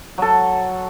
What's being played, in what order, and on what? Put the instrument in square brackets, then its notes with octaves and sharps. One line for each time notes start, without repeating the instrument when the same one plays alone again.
[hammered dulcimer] F#3 A4